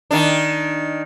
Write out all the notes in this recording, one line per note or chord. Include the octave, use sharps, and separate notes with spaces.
D#3 D4